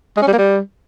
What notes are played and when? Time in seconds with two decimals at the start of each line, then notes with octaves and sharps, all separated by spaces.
0.17 G#3
0.22 C#4
0.27 G3
0.33 A#3
0.38 G3